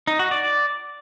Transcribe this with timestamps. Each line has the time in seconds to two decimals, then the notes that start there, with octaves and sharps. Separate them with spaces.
0.07 D#4
0.19 F#4
0.31 D5